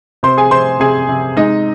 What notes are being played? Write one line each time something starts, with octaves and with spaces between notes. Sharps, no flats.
C3 C5 C6
G#4 G#5
C3 C5 C6
C3 G#4 G#5
C3
G#3 D#4 D#5